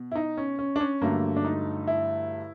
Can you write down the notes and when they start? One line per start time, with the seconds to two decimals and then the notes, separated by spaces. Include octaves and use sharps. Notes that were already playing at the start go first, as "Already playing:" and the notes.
Already playing: B2
0.12 E4
0.15 D#4
0.37 C#4
0.59 C#4
0.76 D4
0.80 C#4
1.01 G2 D3 F#3 A3 A#3
1.36 D4
1.45 D#4
1.87 E4